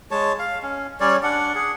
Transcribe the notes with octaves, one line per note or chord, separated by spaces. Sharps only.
G#3 C#5 A5
F5
C#4
G3 C#4 C#5 D5
D4 F#5
G#4 F#5